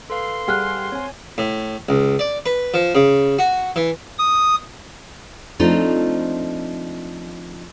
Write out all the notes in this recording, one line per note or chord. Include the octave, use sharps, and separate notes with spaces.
A4 B4 F5 C6
G3 G4 G#4 F#5 F6 F#6
C4 C#5 G#5
A2
C#2
D5
B4
F3
C#3
F#4
E3
D#6
F3 A3 C4 D4 D#4 F4